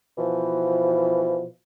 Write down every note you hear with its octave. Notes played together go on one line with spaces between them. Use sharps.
B2 E3 F3